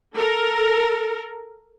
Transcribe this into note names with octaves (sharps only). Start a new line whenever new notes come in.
A4 A#4